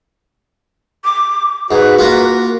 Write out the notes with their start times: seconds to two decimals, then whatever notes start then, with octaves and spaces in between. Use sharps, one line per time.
1.04 D6
1.71 G#2 F#4 B4
1.99 A#3 F4